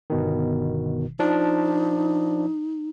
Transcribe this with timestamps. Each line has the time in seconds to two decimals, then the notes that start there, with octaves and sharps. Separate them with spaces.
0.10 G1 B2 D#3
1.19 F3 D4 D#4